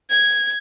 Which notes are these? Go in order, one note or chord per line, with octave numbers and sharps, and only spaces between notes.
G#6